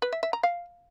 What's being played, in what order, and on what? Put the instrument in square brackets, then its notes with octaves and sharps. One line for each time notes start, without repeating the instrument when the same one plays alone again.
[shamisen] B4
E5
E5
A#5
F5